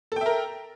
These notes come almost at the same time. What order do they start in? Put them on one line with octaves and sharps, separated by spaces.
A4 G5 E5 A#4